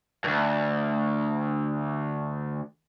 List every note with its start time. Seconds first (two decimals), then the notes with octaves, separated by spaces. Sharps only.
0.24 D2 G2